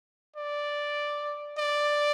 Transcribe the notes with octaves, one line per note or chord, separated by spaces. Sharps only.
D5
D5